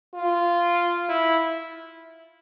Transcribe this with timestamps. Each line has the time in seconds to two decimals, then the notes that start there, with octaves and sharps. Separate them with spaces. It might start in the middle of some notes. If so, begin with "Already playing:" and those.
0.14 F4
1.09 E4